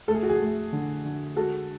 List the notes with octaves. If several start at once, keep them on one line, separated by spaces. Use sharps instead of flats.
A3 A4
G#4
F#4
G#4
A3
D3
D3
G#3 F#4 A4